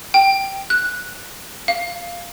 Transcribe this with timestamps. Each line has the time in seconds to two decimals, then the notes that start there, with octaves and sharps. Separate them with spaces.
0.14 G5
0.70 F#6
1.68 F5